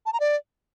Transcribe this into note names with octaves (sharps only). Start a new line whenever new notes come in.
A5
A#5
D5